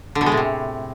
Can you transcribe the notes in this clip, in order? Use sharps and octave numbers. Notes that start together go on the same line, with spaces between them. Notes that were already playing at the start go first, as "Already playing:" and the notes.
D3
B2
G#3
A2
C3